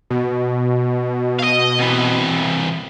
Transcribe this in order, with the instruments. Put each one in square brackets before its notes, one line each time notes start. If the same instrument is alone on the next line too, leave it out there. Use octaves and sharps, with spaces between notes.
[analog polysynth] B2
[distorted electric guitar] D#5 F5
C3 E3